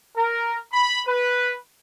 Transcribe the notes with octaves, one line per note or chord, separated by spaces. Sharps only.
A#4
B5
B4